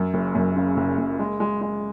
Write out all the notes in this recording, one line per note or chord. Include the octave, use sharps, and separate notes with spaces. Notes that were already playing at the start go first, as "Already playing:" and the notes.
Already playing: F#2
F#1
F#2
C#3
F#1
F#1
G#3
G#3
G#3